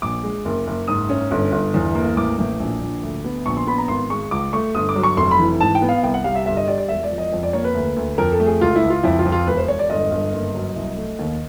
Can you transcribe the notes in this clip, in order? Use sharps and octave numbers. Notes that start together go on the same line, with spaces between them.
A#1 D6
G#3
F#1
F#1
G#2 D#6
C#4
G1
G1
E2
A#3
A1 D6
A1
A#1
A#1
D2
B3
A#1 C#6
C6
B3 B5
A#5
G#1 C6
G#3 C#6
C#2 D6
A3 C#6
G1 D#6
D6
F#3
C#6
F1 C6
B5
E3
G#2 A5
G5
B3
F5
C2 G5
F#5
G3 F5
E5
G1 E5
D#5
G3 D5
D5
E1 E5
D5
F3
D#5
F2
D5
A#3 C#5
B4
D2
D2
F2 A#4
A4
A3
G#4
C#2 F4
E4
C#2
F4
F2 E4
F4
F2
F4
E1 B4
C5
E1 C#5
D5
G1 D#5
G1
F#1
F#3
C2
A3
D#2